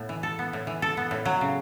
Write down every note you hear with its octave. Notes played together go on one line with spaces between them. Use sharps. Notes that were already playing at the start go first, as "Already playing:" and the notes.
Already playing: A2 B3
E3
A4
B3
A2
E3
A4
B3
A2
F#3
C#3